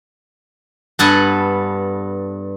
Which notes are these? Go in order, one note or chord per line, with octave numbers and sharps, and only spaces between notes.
G2 B3 A4 F#5 G#5